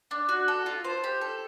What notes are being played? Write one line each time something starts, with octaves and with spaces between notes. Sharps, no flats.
D4
F#4
A4
F4
C5
G4
A4